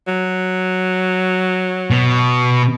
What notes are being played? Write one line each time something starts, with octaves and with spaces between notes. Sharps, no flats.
F#3
B2